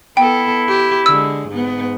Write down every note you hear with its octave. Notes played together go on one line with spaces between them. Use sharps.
B3 E4 A4 G5
G4
D3 G#3 E6
G#2 B3